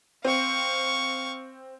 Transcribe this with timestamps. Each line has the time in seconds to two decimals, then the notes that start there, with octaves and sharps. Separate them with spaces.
0.24 C4 F5 C#6